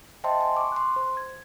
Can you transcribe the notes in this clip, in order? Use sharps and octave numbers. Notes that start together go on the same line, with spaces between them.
C5 D#5 E5 G5 A5 C6
G#5 C6
C#6 D6
C6 F#6
C5
G#6